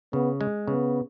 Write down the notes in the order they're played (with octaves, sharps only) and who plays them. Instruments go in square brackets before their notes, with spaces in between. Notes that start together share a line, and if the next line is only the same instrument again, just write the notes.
[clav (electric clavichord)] C#3 [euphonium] B3
[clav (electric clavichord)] G#3
[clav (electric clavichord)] C#3 [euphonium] B3